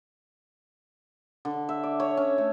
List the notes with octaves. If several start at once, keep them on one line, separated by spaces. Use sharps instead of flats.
D3
E5
D5
C#5
C#4
A3